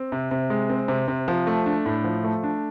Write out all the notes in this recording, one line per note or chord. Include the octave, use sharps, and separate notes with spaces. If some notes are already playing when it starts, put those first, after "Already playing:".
Already playing: C4
C3
C3
G#3
C4
C3
C3
F3
A3
D4
A2
F3
A3
D4